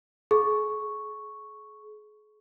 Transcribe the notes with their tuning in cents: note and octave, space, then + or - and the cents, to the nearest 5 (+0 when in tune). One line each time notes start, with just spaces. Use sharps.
G#4 +40 C#6 +0